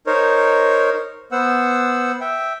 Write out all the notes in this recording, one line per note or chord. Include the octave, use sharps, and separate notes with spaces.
D#4 A#4 C5 C#5
B3 C5 F#5 E6
E5 G5